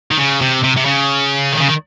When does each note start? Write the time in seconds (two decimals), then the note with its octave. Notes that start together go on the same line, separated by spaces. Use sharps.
0.11 D#3
0.18 C#3
0.41 C3
0.64 C3
0.77 C3
0.86 C#3
1.52 D#3
1.60 C#3
1.68 D#3